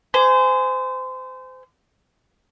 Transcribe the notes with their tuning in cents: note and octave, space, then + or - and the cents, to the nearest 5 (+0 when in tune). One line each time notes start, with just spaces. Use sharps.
G#4 +0 C5 -30